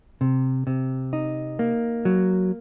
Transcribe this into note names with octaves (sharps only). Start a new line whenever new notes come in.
C3
C3
D#4
A#3
F#3